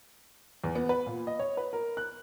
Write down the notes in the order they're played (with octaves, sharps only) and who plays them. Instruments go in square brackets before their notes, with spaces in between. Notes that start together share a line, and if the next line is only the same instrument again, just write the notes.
[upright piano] E2
B3
B4
A#2
D#5
C#5
B4
A#4
F#6